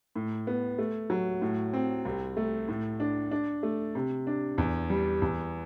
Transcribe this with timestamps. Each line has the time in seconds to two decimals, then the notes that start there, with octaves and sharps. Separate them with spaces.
0.16 A2
0.47 B3
0.78 A3
1.10 F#3
1.42 A2
1.74 C4
2.05 C2
2.37 A3
2.68 A2
3.00 D4
3.31 D4
3.63 A3
3.95 C3
4.27 D4
4.58 E2
4.90 G3
5.22 E2